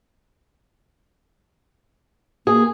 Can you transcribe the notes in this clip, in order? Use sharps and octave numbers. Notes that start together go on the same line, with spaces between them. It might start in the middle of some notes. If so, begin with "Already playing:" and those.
A#3 G#4